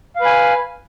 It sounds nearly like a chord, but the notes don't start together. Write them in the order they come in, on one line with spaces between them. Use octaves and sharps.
F5 B4 G#5